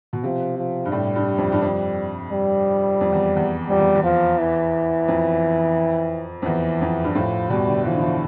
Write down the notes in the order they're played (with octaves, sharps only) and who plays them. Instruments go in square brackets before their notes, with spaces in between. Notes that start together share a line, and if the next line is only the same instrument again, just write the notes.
[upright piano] B2
[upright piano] C3 [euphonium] F3
[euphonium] F3
[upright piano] G2
[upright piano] A2 [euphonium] G3
[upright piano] G2
F2
G2
F2
[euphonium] G3
[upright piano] F2
E2
E2
[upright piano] F2 [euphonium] G3
[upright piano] E2
E2
[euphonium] F3
E3
[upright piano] F2
F2
[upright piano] E2 [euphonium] E3
[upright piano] F2
G2
[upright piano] A2 [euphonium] F3
[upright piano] B2 [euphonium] G3
[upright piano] D3
[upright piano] E3 [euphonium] F3
[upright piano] D3
E3